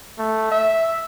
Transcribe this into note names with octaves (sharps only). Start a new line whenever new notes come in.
A3
E5